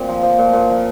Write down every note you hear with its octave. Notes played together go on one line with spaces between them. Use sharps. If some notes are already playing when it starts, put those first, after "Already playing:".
Already playing: A#2 C4
F3
F3
A#2
A#2
F3